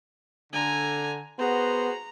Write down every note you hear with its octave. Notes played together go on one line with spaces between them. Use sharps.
D3 G#5 A#5
B3 F#4 G#4 C5 A#5